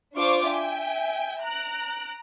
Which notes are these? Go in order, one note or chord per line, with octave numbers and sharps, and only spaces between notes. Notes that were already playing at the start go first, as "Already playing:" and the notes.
D4 F4 C5 F5 C#6 D6
E5 G5 G#5
A#5 F#6 D7